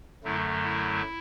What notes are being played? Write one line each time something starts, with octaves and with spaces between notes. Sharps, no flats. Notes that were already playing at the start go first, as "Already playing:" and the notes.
F#2 D3 F#3 A3 E4
E4